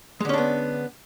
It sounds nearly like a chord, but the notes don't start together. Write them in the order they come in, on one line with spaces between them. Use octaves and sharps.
G#3 D3 C#4 D4 B3